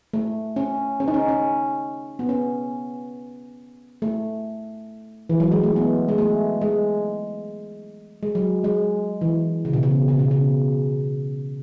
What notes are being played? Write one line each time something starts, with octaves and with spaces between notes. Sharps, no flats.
A3
C#4
C#4
D#4
C#4
C#4
B3
C#4
A3
E3
F#3
G#3
A3
B3
G#3
A3
G#3
G#3
F#3
G#3
E3
C#3
B2
C#3
C#3
B2
C#3